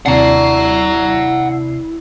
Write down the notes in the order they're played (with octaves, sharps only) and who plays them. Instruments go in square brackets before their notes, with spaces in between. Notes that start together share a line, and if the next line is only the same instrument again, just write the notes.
[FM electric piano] D#2 C3 C7 [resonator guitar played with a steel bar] D4 [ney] E4 [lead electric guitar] F#5 A#5